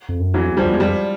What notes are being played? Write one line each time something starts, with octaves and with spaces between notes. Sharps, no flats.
F2
F#2
F2 E3 F#3
E2
F3 G3
E2
G#3
F2 F3 G3